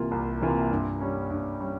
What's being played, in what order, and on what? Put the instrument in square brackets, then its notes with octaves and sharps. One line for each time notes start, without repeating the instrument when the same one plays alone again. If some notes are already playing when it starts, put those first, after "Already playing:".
Already playing: [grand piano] C2 C3 E3 A#3 F4
C2
C3 E3 A#3 F4
G2
G3 C#4
G2
G3 C#4